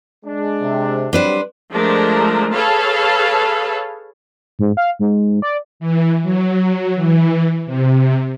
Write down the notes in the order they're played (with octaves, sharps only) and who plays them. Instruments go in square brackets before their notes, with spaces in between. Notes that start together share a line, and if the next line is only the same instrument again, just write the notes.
[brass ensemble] G#3 D4
[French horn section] C3
[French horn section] F#3 G3 C4 [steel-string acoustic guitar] D4 B4 C5
[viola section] F3 G#3 A3 D4 A#4
G#4 A4 B4 C#5 F5 A5
[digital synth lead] G#2
F5
G#2
D5
[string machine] E3
F#3
E3
C3